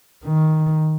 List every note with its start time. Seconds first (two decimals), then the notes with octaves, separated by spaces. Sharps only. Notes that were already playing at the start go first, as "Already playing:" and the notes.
0.25 D#3